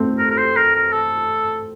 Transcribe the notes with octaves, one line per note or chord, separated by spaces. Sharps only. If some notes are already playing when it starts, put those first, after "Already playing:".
Already playing: A3 C4
A#4
A#4
C5
A#4
A#4
A4